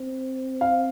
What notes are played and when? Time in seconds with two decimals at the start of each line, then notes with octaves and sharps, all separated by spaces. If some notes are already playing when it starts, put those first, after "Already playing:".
Already playing: C4
0.61 F5